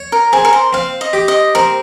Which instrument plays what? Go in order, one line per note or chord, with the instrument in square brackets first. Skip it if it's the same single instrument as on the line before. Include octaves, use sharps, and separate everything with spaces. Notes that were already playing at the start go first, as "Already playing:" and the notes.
Already playing: [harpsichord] C#5
[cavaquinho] A#4
[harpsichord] C4 [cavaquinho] G#4
[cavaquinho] A#4
C5
[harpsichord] C4 [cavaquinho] F5
[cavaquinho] D#5
[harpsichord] G4
[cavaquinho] D#5
[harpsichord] C4 [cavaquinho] A#4